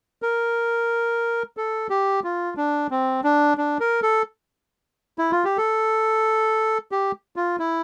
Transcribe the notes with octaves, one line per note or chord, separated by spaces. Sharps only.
A#4
A4
G4
F4
D4
C4
D4
D4
A#4
A4
E4
F4
G4
A4
G4
F4
E4